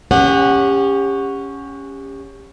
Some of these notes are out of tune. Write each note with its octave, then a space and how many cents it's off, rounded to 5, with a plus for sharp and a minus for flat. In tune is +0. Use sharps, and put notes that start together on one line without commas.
C#4 +0 G4 +30 F#5 -5